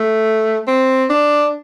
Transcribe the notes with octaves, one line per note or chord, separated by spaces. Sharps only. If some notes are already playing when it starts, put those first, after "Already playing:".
Already playing: A3
C4
D4